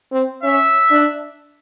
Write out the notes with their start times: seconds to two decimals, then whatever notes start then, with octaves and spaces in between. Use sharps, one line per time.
0.12 C4
0.44 C#4 E5
0.91 D4